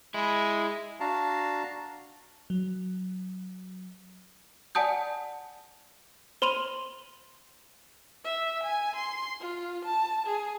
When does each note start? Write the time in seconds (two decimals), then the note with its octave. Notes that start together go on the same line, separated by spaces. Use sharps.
0.14 G#3 E4
1.00 D4 F#4 F5 A5 A#5
2.50 F#3
4.75 D5 F#5 G#5 A5 D#6 G6
6.42 C5 B5 C6 D#7 F7
8.24 E5
8.63 G#5
8.96 C6
9.40 F4
9.84 A5
10.26 G#4